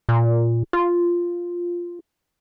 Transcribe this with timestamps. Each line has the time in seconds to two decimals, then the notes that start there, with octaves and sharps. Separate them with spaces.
0.09 A#2
0.73 F4